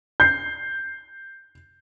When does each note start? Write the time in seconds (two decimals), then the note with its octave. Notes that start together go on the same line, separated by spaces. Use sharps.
0.20 G6 C7